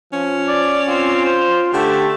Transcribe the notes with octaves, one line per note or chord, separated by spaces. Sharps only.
F3 C#4
D5
C4 F4
C5
D3 A3 G4